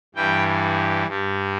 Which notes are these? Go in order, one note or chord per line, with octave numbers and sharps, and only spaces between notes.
G2 E3 G3 G5
G2 G3